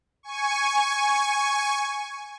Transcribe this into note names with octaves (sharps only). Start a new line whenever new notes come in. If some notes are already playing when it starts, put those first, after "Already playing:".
G#5 C#6